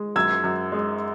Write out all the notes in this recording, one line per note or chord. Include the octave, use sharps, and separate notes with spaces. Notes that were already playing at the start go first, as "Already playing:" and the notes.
Already playing: G#3
F#2 E6 G#6
F#2
G#3